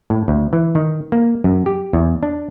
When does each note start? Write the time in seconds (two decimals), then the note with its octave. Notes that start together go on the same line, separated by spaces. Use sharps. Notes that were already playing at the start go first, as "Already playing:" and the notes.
0.10 A2
0.28 D2
0.53 E3
0.75 D#3
1.12 A#3
1.44 F#2
1.66 G4
1.93 E2
2.23 D4